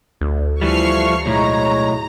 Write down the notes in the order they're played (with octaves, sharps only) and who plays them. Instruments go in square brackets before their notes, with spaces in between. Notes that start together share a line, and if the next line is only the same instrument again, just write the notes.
[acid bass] D2
[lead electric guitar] E3 G3 [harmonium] F3 A3 [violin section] C#6 F6 C7
[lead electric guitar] B1 A2 [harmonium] G#3 C#5 [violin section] A#5